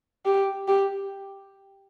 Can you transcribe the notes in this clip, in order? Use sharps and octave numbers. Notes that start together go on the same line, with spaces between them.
G4
G4